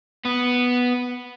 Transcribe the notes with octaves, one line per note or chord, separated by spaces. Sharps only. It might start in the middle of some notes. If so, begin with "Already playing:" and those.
B3